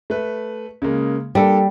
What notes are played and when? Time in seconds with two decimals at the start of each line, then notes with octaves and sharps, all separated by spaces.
0.10 A3 B4
0.82 C#3 G#3 A#3
1.35 G3 A#3 D4 A4